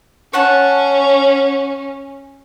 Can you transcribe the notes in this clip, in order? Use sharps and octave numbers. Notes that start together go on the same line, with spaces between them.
C#4 C#5 F#5 A5